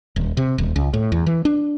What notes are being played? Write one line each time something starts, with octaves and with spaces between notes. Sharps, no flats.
D#1
C3
D#1
C#2
A2
E2
E3
D4